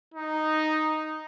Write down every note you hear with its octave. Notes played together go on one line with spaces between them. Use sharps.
D#4